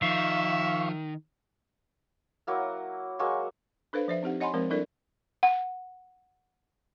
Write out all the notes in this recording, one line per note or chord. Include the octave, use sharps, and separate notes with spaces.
D#3 F3 E5 F5 C#6
F#3 A#3 E4
F#3 G#3 A#3 C#6
D4 A4 B4 C5 F5
F3 C5 E5
C4 D#4 G4 F#5
C#5 D#5 F#5 G#5 B5 C6
F3 G#3 C4 A#4 C5
G3 D4 E4 A4 A#4 D5
F#5